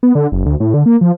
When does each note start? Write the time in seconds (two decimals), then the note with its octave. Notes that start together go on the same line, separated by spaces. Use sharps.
0.03 B3
0.15 D3
0.32 F#1
0.46 D2
0.60 A2
0.74 D3
0.86 A#3
1.01 F3